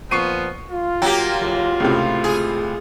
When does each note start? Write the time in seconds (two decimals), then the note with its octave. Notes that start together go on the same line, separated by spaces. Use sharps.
0.11 A#2 F3 B3 C#6 C7 D#7
0.71 F4
1.02 F#3 A#3 G4 G5
1.41 F#1
1.80 C#2 A2 C3
2.24 G#4